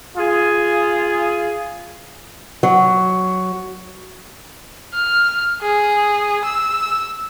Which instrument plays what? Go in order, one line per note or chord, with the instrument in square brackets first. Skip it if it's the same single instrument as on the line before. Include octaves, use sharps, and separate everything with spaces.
[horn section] F4 G#4
[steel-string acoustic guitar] F#3
[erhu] F6
G#4
E6